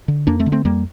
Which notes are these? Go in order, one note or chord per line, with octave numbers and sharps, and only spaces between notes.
D3
F2 A#3 D4
A3 C4
D3
A3 C4
F2 G3 A#3